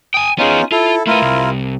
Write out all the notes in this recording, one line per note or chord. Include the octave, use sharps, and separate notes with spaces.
G5 G#5 D#6
B3 C#4 D#4 F4 G#4
E4 F4 A4
A3 E4 F4 A#4 B4
C2